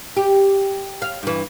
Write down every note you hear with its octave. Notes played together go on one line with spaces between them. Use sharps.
G4
F5
G2 E3